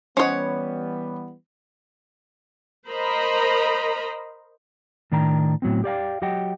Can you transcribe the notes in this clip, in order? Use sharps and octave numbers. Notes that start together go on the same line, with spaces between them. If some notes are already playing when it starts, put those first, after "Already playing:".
E3 G3 B3 C#4 C5 C#5 D#5 F#5
A#4 C5 D#5 A#5 B5
A2 D#3 D4 G5 A#5
A2 F#3 B3 C4
G4 D5 F5 G5
F#3 G4 D#5 F#5 G5